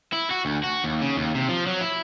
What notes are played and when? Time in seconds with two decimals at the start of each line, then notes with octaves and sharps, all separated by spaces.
0.13 E4
0.31 F#4
0.45 D2
0.64 F#4
0.84 D#2
1.01 C#3
1.17 D#2
1.35 C3
1.49 F3
1.67 F#3
1.81 E4